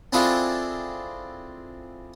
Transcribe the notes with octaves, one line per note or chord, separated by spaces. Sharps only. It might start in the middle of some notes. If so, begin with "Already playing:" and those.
C4 D4 E4 F4 G#4 A4